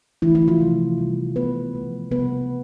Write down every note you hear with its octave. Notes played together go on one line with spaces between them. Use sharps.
D3 E3 A3 E4
E3 E4
F3 F4
C3 F3 A3
C3 E3 G3
C3 F3 A3 B3 B4
C3 F3 A3
C3 G3 B3 B4